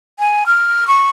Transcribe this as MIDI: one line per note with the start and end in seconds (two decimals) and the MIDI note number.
0.19 0.44 80
0.46 0.87 89
0.87 1.10 85